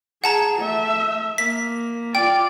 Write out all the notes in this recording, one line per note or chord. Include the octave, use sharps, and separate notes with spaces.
G#4 F#5 A5 A#5
A3 E5
A#3 B6
F4 D5 G5